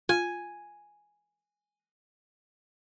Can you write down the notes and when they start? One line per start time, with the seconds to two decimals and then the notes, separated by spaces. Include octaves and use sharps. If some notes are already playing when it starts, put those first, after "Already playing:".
0.09 F4 G#5